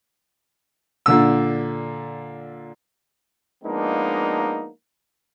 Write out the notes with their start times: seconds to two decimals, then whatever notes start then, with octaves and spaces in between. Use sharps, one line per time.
1.06 A#2 D3 E6
3.64 F3 G#3 A#3 B3 D4 D#4